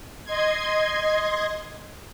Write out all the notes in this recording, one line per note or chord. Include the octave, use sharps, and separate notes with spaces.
D#5 C6 G#6